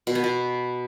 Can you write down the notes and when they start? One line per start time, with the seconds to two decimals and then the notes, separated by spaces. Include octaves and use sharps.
0.07 B2
0.15 B3
0.24 B2